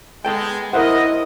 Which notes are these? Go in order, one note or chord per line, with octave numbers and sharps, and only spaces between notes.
G#3 B3 A4 G5
E4 A#4 C5 D#5 E5 F#5